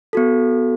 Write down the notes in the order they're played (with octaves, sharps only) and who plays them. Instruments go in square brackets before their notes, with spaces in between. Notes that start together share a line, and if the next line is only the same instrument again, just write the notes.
[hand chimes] B3 F#4 A4